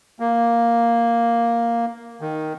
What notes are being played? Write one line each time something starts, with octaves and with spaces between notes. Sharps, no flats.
A#3
D#3